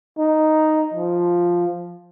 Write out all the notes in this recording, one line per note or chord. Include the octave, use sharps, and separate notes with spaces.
D#4
F3